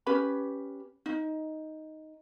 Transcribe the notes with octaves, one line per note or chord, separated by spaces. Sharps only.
C#4 G4 B4 B5
D#4